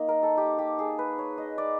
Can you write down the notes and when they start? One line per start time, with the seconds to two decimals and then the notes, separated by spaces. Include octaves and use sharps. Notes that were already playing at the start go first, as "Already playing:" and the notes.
Already playing: A#3 D#4
0.08 A#4
0.23 A4
0.37 G4
0.58 G4
0.79 G#4
0.99 B4
1.18 C#5
1.38 D#5
1.58 D5